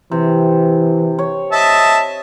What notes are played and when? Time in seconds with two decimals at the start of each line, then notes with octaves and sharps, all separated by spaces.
0.12 C3 E3
1.19 C#5
1.52 D#5 E5 A5